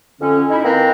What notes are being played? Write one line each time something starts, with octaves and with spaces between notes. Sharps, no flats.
F2 D3 C#4
D#4 E4
A#3 C4 B4 G5 A#5